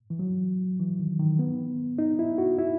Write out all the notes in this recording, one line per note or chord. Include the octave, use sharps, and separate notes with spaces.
E3
F#3
E3
D#3
D#3
B3
D#4
E4
F#4
E4